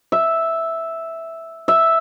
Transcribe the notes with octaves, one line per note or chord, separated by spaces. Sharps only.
E5
E5